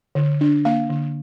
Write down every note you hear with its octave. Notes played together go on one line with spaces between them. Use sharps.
D3
D4
A#3 F5
D3